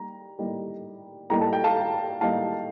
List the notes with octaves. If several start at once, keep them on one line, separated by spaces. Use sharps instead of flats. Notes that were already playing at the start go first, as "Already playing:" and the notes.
Already playing: G3 A#3 D#4 A#5
A2 G3 A#3 D#4
A2 G3 A#3 D#4 A#5
A5
G5
F5 A5
A2 G3 A#3 D#4 F5 A5